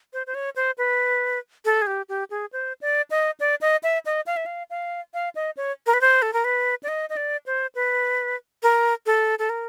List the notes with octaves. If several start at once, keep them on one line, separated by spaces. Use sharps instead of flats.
C5
C5
C#5
C5
B4
A4
G#4
G4
G4
G#4
C5
D5
D#5
D5
D#5
E5
D#5
F5
E5
F5
F5
F5
D#5
C#5
A#4
B4
C5
A4
A#4
B4
D5
D#5
D#5
D5
C5
B4
A#4
A4
A4
A#4